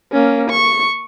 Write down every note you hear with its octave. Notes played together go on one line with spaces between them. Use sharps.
A#3 C#4
C#6